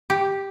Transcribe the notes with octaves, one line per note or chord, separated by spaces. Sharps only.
G4